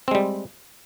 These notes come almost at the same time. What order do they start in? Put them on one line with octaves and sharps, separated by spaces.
C4 G#3 G3